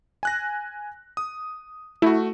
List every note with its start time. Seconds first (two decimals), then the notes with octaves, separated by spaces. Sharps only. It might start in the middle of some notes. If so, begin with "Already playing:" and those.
0.23 G#5 F#6 A#6
1.17 D#6
2.02 A3 E4 F#4